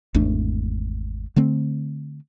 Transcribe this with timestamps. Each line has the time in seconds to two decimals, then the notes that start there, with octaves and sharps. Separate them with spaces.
0.14 G#1 E2 A3 D4
1.36 D3 A3 C4